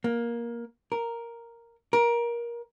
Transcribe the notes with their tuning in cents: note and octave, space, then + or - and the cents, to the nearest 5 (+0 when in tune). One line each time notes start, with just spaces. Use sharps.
A#3 +15
A#4 +0
A#4 +20